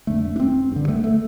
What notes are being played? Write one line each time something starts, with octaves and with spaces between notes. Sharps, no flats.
F2 D3 A3
D4
C4
G2 D3
A3
A3